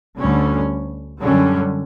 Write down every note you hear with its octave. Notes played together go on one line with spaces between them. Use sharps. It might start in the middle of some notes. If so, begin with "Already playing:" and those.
D2 D3 G3 C#4
F#2 D3 G3 C#4